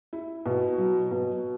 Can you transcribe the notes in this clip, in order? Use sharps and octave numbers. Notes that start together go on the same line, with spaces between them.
E4
B2
F#3
B2